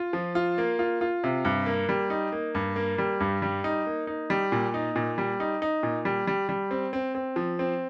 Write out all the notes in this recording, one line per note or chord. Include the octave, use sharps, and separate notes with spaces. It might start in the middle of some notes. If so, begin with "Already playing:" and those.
Already playing: F4
F3
F4
A#3
F4
F4
C3
G2
A#3
G3
D#4
A#3
G2
A#3
G3
G2
G3
D#4
A#3
D#4
G3
A#2
D#4
A#2
G3
D#4
D#4
A#2
G3
G3
G3
C4
C4
C4
F3
C4